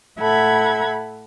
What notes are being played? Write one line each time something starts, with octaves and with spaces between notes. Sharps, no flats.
A2 A4 E5 F#5 B5 G#6